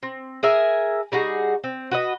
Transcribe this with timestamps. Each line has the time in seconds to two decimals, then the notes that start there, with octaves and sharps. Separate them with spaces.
0.03 C4
0.43 G#4 A#4 E5 G#5
1.12 G3 D#4 F#4 G#4
1.64 C4
1.91 F#4 B4 D#5